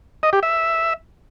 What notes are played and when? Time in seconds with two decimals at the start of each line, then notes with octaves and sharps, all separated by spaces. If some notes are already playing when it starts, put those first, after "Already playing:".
0.23 D#5
0.33 G4
0.43 E5